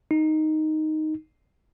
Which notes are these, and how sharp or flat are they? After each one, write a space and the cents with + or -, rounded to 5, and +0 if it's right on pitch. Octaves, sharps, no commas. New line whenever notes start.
D#4 +0